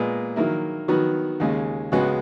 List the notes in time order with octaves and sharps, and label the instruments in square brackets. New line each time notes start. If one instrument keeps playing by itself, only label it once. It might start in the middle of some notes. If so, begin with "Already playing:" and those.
Already playing: [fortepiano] A#2 G#3 B3
D#3 F#3 A#3 E4
D#3 F#3 B3 F#4
D#2 C#3 G#3
C#2 C#3 G#3 B3 F#4